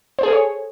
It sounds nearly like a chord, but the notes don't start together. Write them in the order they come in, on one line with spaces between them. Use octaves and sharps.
C5 G#4 A4 C#5